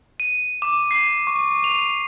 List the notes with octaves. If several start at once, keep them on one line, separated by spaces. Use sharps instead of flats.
D#7
D6
C7
C#6
F7